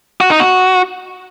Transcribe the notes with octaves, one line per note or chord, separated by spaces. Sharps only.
F#4
D#4
F#4